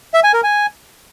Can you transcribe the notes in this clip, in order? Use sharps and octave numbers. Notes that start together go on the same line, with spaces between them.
E5
G#5
A#4
G#5